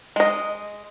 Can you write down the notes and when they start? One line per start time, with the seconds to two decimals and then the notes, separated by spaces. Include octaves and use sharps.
0.16 G#3 D#5